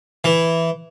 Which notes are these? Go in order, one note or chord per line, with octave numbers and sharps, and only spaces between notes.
E3